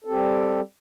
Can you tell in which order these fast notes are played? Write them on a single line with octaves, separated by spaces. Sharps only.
A4 C4 G4 G3